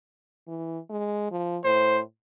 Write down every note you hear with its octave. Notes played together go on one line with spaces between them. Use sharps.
E3
G#3
F3
A2 C5